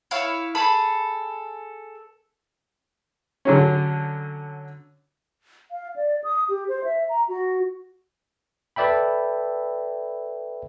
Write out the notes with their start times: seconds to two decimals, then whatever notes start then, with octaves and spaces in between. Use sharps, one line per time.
0.11 E4 C#5 F5
0.55 G#4 A4 B5
3.45 D3 F#3 C#4
5.71 F5
5.96 D5
6.24 D#6
6.49 G4
6.68 C5
6.84 E5
7.09 A#5
7.28 F#4
8.76 A4 B4 D5 E5 G5 B5